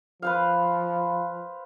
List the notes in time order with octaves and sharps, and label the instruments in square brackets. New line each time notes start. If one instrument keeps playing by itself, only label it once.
[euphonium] F3 [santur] B4 C5 F5